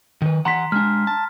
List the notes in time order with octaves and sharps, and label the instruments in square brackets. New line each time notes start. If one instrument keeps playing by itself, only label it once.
[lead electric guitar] D#3 B4
[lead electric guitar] E3 F#5 [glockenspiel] A#5 C6 B6
[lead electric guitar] G#3 D4 [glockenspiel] F6
[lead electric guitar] A5